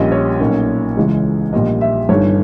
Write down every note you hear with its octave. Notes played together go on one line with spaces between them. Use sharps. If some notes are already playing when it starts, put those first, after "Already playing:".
Already playing: A#1 A#2 G3 C#4 D#5
C#5
B1 A#2 A#3 C#4
C#2 C#3 E3 G#3
A#1 A#2 G3 D#5
E5
G1 G2 D#3 C#5